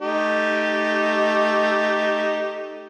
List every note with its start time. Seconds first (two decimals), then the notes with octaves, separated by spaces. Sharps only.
0.01 A3 D#4 G4